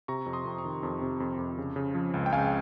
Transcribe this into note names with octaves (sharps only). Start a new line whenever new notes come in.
C3 A#5 C#6
F2
C6 D#6
F2
A#5 C#6
D#3
F2
C3
F2
F2
C#3
C#3
F3
C#2
G5
C#2 F5 G#5